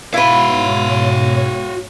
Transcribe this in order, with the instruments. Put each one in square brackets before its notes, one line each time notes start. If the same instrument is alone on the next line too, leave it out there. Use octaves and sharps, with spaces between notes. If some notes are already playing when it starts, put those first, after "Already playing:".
[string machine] G#2 B2 C#5 [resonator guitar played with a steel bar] E4 B4 [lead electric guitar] F#4 F5